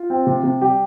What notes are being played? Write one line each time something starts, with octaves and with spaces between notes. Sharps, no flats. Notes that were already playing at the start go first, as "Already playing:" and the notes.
Already playing: F4
C4
C3
C3
G3 G4